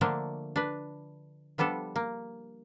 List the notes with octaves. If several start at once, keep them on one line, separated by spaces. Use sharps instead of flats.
D3 F3 A3 A#3 D4
D4 B4
F3 G3 B3 D4 A4
A#3